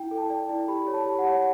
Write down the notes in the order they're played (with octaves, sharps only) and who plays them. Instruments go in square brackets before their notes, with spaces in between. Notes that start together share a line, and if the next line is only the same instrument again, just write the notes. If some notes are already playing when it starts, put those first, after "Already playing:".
Already playing: [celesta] E4 G5
A4
A5
D5
E4
G4 B5
C#5
A5
G4
F#5
C#5